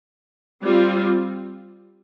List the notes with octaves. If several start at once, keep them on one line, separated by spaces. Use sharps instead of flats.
G3 C4 F4